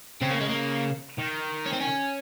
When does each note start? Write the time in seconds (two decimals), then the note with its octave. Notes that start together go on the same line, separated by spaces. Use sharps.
0.22 C#3 C4
0.31 A#3
0.41 G#3
0.49 A#3
1.18 D#3
1.66 C#4
1.73 C4
1.81 C#4